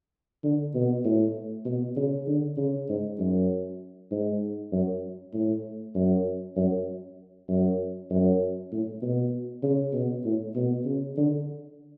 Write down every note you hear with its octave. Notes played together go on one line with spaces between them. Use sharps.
D3
B2
A2
B2
C#3
D3
C#3
G#2
F#2
G#2
F#2
A2
F#2
F#2
F#2
F#2
A2
B2
C#3
B2
A2
B2
C#3
D3